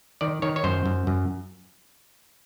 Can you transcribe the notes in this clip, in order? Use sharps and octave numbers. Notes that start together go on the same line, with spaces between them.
D#3 D5
D#3 C#5
C#5
F#2 C5
F#2
F#2